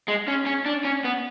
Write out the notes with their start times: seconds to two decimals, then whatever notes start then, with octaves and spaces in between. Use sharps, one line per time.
0.08 G#3
0.28 C#4
0.46 C#4
0.66 D4
0.85 C#4
1.04 B3